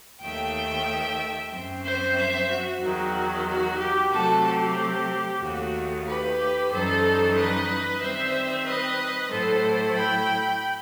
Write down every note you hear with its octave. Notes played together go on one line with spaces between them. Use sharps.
D#2 D#3 A3 E5 G5
F#2 F#3 C4
C5 E5
C5 E5
F#4
E2 D#3 F#3
F#4
G4
C3 F#3 A3 C4 F#4 A4
G4
D#2 D#3 A3 F#4
G4 B4
F#2 E3 G3 D#4 A4 C5
B4 D#5
D#3 G3 C4 C5 E5
B4 D#5
A2 F#3 A3 E4 A4 C5
G5 B5